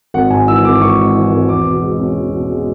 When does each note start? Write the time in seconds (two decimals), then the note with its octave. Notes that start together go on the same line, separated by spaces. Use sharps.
0.14 G#1 F#5
0.30 G#2 G#5
0.47 E3 E6
0.64 G#1 D6
0.81 G#1 C#6
0.98 G#2
1.15 E3
1.32 G#1
1.49 E2 D6
1.66 B2
1.82 G#3
2.00 C#4
2.17 E2
2.33 B2
2.51 G#3